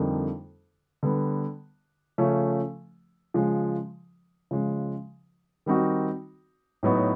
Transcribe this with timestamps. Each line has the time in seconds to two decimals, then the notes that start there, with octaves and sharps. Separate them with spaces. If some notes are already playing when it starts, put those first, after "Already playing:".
Already playing: F2 D3 G3 A#3 D#4
1.03 D3 G3 B3
2.18 C#3 F3 A3 C#4
3.34 C#3 F3 G#3
4.51 C#3 F3 G#3
5.66 D#3 G3 C4 D#4 F#4
6.83 A2 F#3 B3 D#4 F#4